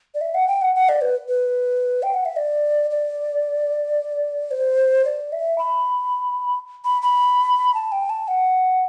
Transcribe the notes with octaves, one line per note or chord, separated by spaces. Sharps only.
D5
E5
F#5
G5
F#5
F#5
D5
B4
B4
G5
F#5
E5
D5
D5
C5
D5
E5
B5
B5
B5
A5
G5
A5
F#5